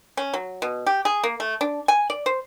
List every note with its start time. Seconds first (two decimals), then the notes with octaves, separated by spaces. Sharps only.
0.17 C#4
0.33 F#3
0.62 B2
0.86 G4
1.05 G#4
1.24 A#3
1.40 A3
1.61 D4
1.88 G#5
2.10 D5
2.26 C5